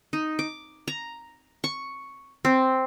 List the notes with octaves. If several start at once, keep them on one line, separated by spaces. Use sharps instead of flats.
D#4
D6
A#5
C#6
C4